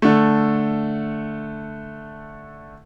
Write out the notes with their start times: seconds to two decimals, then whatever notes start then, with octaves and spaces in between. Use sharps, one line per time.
0.02 D3 A3